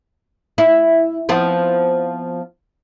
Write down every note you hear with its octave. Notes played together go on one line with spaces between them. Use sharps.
E4
F3 B3 C4